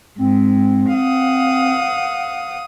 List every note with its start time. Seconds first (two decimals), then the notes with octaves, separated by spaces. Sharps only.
0.18 G#2 C4
0.93 F5 F#5 D#6